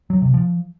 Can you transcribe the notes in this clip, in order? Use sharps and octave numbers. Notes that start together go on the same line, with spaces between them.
F#3
C3
F3